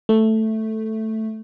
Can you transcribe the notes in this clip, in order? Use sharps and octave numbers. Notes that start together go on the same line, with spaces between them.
A3